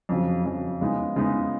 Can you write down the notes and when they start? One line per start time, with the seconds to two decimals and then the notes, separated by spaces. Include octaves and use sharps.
0.09 F2 C#3 F#3
0.45 F2 C#3 F#3
0.81 C#3 G#3 B3 D#4
1.16 C#3 G#3 B3 D#4